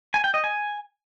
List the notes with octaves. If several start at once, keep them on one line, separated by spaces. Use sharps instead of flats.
G#5
G5
D#5
G#5